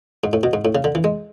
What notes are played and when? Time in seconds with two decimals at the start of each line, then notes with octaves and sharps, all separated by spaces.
0.24 G#2
0.33 A2
0.43 B2
0.53 G#2
0.65 A2
0.75 C#3
0.84 D3
0.95 E3
1.04 G#3